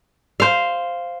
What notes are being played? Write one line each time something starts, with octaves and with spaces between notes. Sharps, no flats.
C5 F5